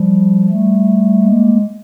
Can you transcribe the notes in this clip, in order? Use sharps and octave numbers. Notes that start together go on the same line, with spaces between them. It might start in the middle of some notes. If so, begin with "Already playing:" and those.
Already playing: F3 G3
G3 A3
G#3 A#3